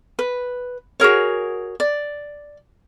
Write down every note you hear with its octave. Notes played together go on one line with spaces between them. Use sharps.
B4
F#4 G#4 A#4 C#5
D5